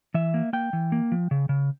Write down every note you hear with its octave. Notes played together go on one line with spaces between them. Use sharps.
E3 E5
A#3
A#3 G5
E3
A#3
F3
C#3
C#3